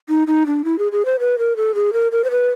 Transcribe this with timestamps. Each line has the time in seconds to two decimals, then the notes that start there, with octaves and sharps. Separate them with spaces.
0.09 D#4
0.27 D#4
0.47 D4
0.65 E4
0.79 G#4
0.92 G#4
1.05 C5
1.20 B4
1.39 A#4
1.57 A4
1.75 G#4
1.93 A#4
2.12 A#4
2.24 C5
2.31 B4